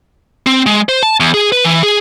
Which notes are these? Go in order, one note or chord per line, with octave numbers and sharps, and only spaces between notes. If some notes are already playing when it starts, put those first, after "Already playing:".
C4
G#3
C5
A5
E2
G#4
B4
E3
G#4